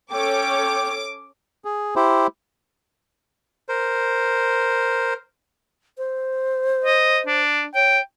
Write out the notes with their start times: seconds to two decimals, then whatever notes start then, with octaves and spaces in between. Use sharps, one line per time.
0.12 C#4 A4 C#5 G5 D6
1.65 G#4
1.96 E4 G4 C5
3.69 A#4 C5
5.98 C5
6.85 D#5
7.26 D4
7.75 C#5 G5